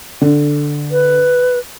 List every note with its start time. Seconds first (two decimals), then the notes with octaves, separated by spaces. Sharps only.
0.21 D3
0.91 B4